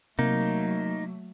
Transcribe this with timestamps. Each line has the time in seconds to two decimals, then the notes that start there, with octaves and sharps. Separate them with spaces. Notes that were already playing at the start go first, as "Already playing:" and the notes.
0.19 C3 F#3 A3 A#3 D#4